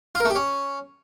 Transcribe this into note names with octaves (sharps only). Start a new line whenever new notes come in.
F4
A#4
A3
G4
C#4